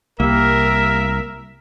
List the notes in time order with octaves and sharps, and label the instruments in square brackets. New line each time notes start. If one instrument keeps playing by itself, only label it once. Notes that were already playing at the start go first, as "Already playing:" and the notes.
[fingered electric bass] C2 G3 [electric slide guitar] A#3 [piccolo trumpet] A#4 [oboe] E5